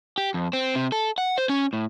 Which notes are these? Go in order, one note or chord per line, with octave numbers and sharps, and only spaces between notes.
G4
F2
C4
C3
A4
F#5
C5
C#4
A2